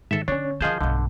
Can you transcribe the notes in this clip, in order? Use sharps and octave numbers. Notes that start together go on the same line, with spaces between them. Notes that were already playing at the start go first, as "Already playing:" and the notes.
G#2 D#3 A4 E5
D3 C#4 D4 C#5
D#3 F3 C#4 G#4 D#5 F5 A5 G6
B1 G2 D3